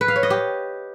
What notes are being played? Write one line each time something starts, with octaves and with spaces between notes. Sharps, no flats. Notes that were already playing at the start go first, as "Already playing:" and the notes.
B4
F5
C#5
D#5
G4